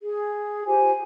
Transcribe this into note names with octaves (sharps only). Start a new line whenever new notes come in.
G#4
F4 G4 C5 G#5